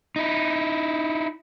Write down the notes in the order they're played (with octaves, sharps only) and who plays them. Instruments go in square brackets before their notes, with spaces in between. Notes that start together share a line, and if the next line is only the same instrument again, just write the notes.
[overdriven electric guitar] D#4 E4